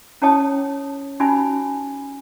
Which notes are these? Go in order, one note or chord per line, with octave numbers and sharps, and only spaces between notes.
C#4 E4 C#5 G5 A5 D#6
C#4 D#4 F4 F#4 G#5 B5